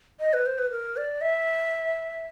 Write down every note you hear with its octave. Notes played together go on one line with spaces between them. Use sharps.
D#5
B4
C5
B4
A#4
D5
E5